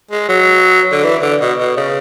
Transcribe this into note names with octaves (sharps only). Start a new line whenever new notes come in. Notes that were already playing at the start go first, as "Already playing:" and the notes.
G#3
F#3
D3
E3
D3
B2
B2
C#3